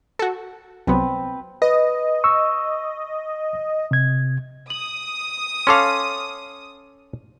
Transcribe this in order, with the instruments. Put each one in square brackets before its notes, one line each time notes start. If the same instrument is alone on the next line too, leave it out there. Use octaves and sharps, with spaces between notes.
[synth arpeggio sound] F#4 A4
[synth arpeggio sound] C2 F#3 B3 [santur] C4 B4
[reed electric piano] B4 [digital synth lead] D#5
[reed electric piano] C#6 E6
C3 G#6
[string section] D#6 [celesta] F#7
[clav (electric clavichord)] C#4 A4 F5 [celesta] C6 D6